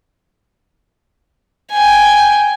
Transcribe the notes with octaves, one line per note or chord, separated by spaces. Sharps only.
G5 G#5